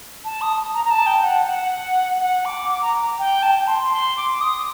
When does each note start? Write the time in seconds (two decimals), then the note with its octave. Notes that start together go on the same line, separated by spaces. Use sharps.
0.24 A5
0.41 D#6
0.74 A#5
0.84 A#5
0.90 A5
1.06 G5
1.22 F#5
1.47 F#5
2.20 F#5
2.45 D6
2.69 D6
2.82 A#5
3.19 G5
3.43 A5
3.67 C6
3.92 C6
4.17 D6
4.31 D6
4.41 D#6